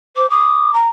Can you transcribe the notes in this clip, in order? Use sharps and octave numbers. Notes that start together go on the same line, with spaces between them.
C5 D6
D6 D#6
A#5